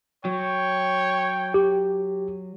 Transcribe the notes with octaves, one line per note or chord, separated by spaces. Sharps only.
F#3 C#5 G5
G4